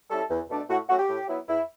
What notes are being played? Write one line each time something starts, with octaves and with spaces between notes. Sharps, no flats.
G3 C#4 E4 A4
E2
B2 A3 D4
A2 F#4
F#3 A3 C#4 F#4
G4
A2
F#3 B3 E4
E2 E4